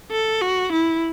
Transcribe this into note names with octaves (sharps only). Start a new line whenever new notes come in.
A4
F#4
E4